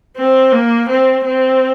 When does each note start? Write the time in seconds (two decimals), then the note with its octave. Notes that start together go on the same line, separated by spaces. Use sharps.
0.17 C4
0.52 A#3
0.89 C4
1.26 C4